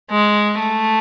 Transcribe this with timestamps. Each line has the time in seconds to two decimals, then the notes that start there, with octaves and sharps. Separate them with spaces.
0.11 G#3
0.59 A3